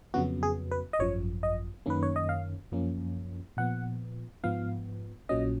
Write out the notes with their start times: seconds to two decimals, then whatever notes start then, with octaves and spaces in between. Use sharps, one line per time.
0.14 F2 C#3 F#3 B3 F#4
0.43 G#4
0.72 B4
0.93 D#5
0.99 G#1 F#2 F3 C#5
1.43 D#5
1.86 F#2 D#3 A#3 C#4 B4
2.03 C#5
2.16 D#5
2.29 F5
2.71 F#2 F3 A#3 C#4
3.57 A#2 F3 B3 F#5
4.44 G#2 F3 B3 F5
5.29 A#1 A#2 F#3 C#4 D#5